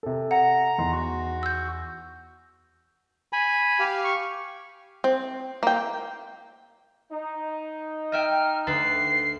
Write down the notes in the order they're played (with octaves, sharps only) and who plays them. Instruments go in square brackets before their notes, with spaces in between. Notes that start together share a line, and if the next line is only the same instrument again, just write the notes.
[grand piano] C3 A4
[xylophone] F#5 [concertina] A#5
[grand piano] E2 D#4 C6
[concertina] F#4
[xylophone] E6 G6
[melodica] G#5 B5
[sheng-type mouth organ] G4 F5
[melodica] C#6
[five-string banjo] C4
A#3 G5
[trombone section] D#4
[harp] D#5 E5 G5 [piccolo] F6
[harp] D2 A4 B4 [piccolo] C7